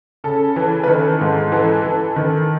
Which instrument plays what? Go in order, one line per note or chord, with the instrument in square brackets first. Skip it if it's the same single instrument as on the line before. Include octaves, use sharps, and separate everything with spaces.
[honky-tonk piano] C#3 A4
E3
B4
D#3 A4
G#2
E3 A4
E3
D#3